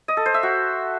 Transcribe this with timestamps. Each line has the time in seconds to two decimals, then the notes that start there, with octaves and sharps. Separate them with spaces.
0.08 D#5
0.17 A4
0.26 C5
0.34 E5
0.43 F#4